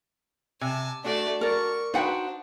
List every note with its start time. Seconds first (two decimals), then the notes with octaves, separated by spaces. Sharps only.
0.61 C3 G#5 A5
1.04 A3 D4 F#4 D5
1.41 A#4 D5 C#6
1.94 D4 D#4 F#4 B4 C5 F#5 G5